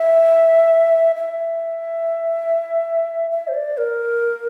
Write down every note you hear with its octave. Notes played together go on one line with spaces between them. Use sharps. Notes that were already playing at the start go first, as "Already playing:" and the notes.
Already playing: E5
E5
E5
C5
D5
A#4